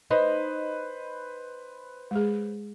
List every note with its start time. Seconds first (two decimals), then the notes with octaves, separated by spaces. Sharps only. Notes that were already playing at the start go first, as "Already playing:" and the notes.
0.11 D#4 B4 C5
2.11 G#3 G#4